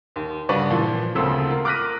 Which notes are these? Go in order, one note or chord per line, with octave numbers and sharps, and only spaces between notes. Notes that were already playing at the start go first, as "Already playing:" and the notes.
D#2
G2 C#3 F#4 B4 D5 C#6
A#2 E3 F3
E1 D2 C#3 C4 A4 E6
F4 A#4
D6 F6 F#6 A#6 B6 D#7